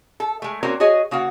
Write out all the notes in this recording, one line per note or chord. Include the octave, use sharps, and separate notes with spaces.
A4
G#3 A3
A#3 C4 C#4 F#4 A#4 C5
F#4 G#4 C#5 D#5
C#3 A#3 F#4 F#5